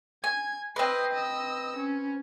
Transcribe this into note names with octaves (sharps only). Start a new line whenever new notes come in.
G#5 G#6
C4 B4 D#5 C7
D#5 E6
C#4